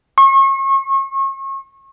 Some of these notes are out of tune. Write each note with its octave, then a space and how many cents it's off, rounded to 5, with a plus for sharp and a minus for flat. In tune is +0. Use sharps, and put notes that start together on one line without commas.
C#6 -35